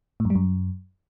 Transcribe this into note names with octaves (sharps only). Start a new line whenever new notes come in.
A2
F#2
G3
F#2